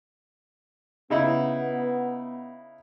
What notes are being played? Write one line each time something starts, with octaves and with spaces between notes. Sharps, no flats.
C#3 B3 D#4 E4